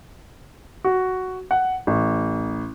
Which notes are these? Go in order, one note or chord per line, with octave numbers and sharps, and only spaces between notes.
F#4
F#5
A1